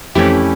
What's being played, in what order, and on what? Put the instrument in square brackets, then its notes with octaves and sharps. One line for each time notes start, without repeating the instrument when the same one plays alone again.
[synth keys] F2 E3 A3 C#4 E4 G4